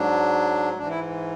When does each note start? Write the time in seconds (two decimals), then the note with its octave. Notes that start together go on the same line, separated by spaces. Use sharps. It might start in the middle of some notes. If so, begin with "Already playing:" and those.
Already playing: G#2 F#3 D4
0.77 G#2 E3 D4
0.89 E4